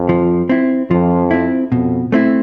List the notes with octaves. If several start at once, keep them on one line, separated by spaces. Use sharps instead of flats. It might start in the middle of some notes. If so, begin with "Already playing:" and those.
Already playing: F2
F3
C4 E4
F2 F3
C4 E4
F2 B2
A3 C4 E4